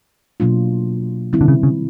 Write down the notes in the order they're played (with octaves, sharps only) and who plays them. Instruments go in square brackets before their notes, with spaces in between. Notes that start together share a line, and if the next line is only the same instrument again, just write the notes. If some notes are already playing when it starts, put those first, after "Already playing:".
[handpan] B2 F#3 A#3 D4 F4
C3 D#3 G3 C4 E4
[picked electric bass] D3
C#3
C#3